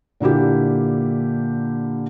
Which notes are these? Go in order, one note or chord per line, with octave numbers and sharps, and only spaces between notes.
A#2 D3 A#3 E4 G4